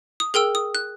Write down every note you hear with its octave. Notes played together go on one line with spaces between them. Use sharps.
D#6
G#4 A#4 G5 E6
D#6
F#6